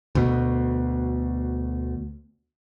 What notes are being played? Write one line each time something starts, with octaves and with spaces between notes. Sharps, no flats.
D2 B2